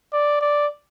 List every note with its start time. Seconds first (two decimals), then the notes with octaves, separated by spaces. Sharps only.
0.13 D5
0.41 D5